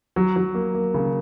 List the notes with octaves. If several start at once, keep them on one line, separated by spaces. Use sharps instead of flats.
F#3
F#3
A#3
A#3
C#3